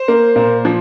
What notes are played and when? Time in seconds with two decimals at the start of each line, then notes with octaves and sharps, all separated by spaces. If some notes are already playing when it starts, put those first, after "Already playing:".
Already playing: C5
0.08 A#3
0.36 A#2
0.65 F3